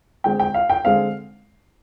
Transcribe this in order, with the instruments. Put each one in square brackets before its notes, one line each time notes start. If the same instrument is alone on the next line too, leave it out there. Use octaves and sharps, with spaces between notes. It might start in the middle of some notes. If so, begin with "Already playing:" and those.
[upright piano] D3 G#3 C4 G5
G5
F5
G5
D3 G#3 C4 F5